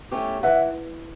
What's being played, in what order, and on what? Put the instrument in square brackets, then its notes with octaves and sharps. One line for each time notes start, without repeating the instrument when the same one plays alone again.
[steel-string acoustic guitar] A3 C#4 E4 G4
[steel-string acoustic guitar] E3 [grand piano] E5 F#5